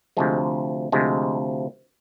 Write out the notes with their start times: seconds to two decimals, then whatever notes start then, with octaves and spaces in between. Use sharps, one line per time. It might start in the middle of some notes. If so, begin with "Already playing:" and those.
0.17 D2 C3 F3 G#3
0.92 D2 C3 F3 G#3